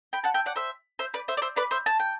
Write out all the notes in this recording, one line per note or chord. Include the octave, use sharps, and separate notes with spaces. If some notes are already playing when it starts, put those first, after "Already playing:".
G5 B5
F#5 A5
E5 G5
D5 F#5
C5 E5
C5 E5
B4 D5
C5 E5
D5
C5 E5
B4 D5
C5 E5
A5
G5